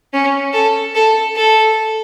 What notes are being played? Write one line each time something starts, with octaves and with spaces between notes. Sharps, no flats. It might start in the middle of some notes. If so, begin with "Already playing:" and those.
C#4
A4
A4
A4